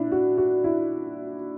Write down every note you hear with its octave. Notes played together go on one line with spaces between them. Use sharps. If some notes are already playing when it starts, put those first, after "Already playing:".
Already playing: A#2 D4 E4
F#4
F#4
E4